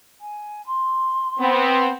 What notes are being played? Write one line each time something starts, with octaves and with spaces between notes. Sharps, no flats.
G#5
C6
B3 C4